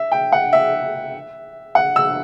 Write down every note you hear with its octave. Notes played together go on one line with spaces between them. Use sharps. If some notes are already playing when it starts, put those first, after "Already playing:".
Already playing: E5
G5
F#5
E5
F#5
E6